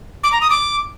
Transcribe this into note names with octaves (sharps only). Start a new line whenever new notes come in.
D6
A#5
D#6
D6